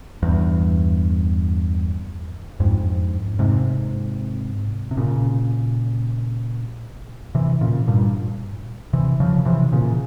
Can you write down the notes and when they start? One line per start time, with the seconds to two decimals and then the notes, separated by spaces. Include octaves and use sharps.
0.23 E2 G2
2.60 F2 G#2
3.39 G#2 C3
4.91 C3
4.97 A#2 C#3
7.35 C3 E3
7.61 A#2 C#3
7.88 G2 A#2
8.93 C3 E3
9.20 C#3 F3
9.45 C3 E3
9.72 A#2 C#3